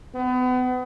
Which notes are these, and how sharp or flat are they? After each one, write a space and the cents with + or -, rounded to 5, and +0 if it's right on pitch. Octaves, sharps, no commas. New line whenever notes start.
B3 +35